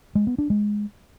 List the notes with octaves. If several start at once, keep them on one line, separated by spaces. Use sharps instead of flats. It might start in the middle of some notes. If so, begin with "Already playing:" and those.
G#3
B3
D4
G#3